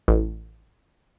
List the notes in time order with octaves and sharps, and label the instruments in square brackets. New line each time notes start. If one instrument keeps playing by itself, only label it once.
[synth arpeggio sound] A1